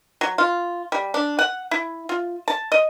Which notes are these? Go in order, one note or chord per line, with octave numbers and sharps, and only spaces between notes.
F#3
F4
G3
D4
F#5
E4
F4
A5
D#5